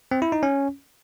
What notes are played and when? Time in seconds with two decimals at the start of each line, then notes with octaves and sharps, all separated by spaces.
0.11 C4
0.22 E4
0.32 D#4
0.43 C#4